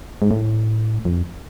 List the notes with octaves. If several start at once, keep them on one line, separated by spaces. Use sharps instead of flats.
G#2
A2
F2